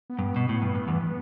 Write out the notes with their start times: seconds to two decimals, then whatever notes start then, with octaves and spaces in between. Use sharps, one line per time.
0.10 B3
0.19 G2
0.36 B2
0.49 A2
0.62 G2
0.75 G2
0.88 E2